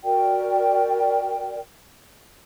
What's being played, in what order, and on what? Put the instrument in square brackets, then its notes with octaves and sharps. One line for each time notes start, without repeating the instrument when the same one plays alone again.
[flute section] F#4 A#4 D5 G5